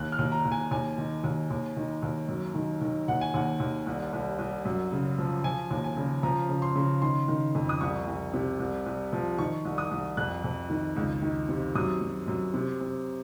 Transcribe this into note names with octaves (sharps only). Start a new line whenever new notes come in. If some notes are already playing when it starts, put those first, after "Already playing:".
Already playing: D#2 F#6
F6
D#2
A#5
D#2
G#5
D#2 G#5
D#3
D#2
D#2
D#3
D#2
F#2
D#3
D#3
D#2 F#5
G#5
D#2 F#5
D#2
C2
C2
C2
F#2
C#3
F3
F3 G#5
D#2
G#5
C#3
F3 A#5
C#3
C6
C#3
D#3 C6
D#3
F2
D#6
C2 C#6
C2
C3
C2
C2
F3
D#3 C#6
C2
D#6
C2
F2 F#6
F2
D#3
C#2
D#3
C3
F#2 D#6
F#2
F#2
C3
C3